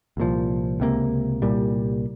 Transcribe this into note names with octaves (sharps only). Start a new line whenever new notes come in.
C2 A#2 F3
C#2 C3 F3 A#3
C2 A#2 G3